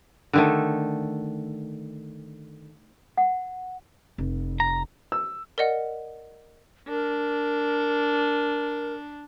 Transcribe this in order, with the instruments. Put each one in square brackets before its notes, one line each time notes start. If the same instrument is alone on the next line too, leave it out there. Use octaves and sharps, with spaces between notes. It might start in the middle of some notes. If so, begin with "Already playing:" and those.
[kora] D3 D#3 A3
[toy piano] F#5
[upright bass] F1
[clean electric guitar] A#5
[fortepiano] E6
[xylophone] A#4 D5 D#5 F#5
[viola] D4 [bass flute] A#4